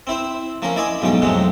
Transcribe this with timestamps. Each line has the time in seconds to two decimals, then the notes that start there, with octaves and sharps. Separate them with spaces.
0.07 C4 E4 C5
0.62 F3 A#3 C#4 A#4
0.76 E4 D5 D#5 G#5 C6
1.02 B1 G#2 F3 C#4 G5
1.22 F2 A2 C3 F#3 G#3